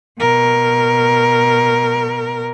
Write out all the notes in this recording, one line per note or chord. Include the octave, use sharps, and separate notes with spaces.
B2 A#4